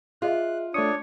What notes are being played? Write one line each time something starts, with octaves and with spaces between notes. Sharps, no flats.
F4 G#4 D#5 E5 F#6
A3 D4 C#5 D#6 C#7